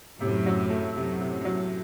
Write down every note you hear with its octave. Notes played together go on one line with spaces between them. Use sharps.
F#2 A2 C3
F#3
A3
F#2 A2 C3
C3
F#3